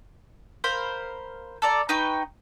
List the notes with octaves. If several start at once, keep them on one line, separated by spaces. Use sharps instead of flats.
A#4 C5 F5 B5
A4 D5 A#5
D#4 B4 G5 C#6